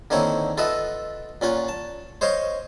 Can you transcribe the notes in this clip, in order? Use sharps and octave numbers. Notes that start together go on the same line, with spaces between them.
D3 D#3 A#3 C4 E4 C#5
F4 A4 B4 D#5 E5 F#5
A#2 C#4 F4 F#5
A5
C5 C#5 D#5 F5 C6